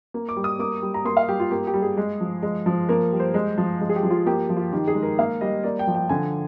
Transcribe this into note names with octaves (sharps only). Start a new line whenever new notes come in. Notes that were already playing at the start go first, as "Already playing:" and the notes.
A#3
D6
G3
D#6
A#3 D6
G3
A#5
A#3 C6
F5
G3 G4
F4
A#3 G4
G4
G3
G#4
G#3
F3
G#3
F3
A#3 A#4
G3
C5
G#3
F3
G#3
G#4
G4
F3
F4
A#3 G4
F3
F4
D#3 G4
G#4
G#3
A#4
A#3 F5
G3 D#5
A#3 D5
G5
F3
G5
D3 G#5